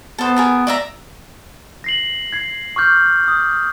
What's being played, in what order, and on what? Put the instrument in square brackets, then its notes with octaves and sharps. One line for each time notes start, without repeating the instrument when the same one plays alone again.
[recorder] B3 [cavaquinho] A4 C5
[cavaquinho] G#4 A#4 A5
D5 E5 A#5
[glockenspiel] A#6 C7 F#7
G#6 C7
C#6 D6 F6 G6
D#6